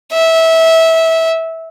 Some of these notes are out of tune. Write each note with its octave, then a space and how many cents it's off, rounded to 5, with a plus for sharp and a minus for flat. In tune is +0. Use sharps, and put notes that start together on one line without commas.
E5 -20